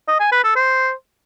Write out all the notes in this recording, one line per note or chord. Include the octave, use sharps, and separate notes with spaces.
D#5
G#5
B4
A4
C5